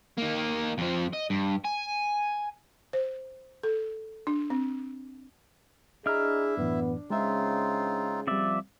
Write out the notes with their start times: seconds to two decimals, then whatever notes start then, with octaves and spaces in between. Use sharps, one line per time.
0.18 A#3 D#4
0.78 F2 F3
1.13 D#5
1.30 G2
1.64 G#5
2.93 C5
3.63 A4
4.27 D4
4.50 C4
6.06 D4 E4 G#4 D#5 E5 A#5 F6
6.57 F#2 A2 E3 B3
7.10 C#3 G#3 C4 D#4 F4 E5
8.27 F3 G3 C4 D5 E5